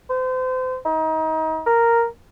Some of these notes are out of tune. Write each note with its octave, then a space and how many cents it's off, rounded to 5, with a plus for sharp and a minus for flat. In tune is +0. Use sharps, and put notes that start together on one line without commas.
C5 -35
D#4 +30
A#4 -5